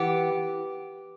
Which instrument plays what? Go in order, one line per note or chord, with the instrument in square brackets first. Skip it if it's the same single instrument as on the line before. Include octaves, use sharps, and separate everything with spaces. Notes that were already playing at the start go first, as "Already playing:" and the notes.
Already playing: [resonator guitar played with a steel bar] E3 B3 G4